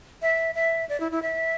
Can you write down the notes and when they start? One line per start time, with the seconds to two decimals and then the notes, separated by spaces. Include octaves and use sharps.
0.22 E5
0.55 E5
0.89 D5
1.00 E4
1.12 E4
1.22 E5